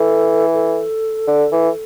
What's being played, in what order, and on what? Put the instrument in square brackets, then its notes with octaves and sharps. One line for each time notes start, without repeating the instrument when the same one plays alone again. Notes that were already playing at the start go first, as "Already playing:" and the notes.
Already playing: [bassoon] E3 [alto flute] A4
[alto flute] A4
[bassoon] D3
E3